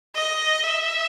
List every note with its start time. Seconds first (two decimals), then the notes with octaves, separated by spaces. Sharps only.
0.16 D#5
0.64 E5